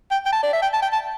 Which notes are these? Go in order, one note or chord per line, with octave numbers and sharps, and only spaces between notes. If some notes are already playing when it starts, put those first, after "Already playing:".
G5
G5
A5
D5
E5
G5
A5
G5
A5